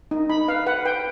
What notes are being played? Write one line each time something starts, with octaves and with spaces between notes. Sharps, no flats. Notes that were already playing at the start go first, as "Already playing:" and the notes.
D#4
D#4 B5
B4 F5
B4 F#5
B4 G5